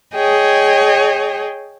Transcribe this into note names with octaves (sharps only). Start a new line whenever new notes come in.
G#4 C#5 D#5 G5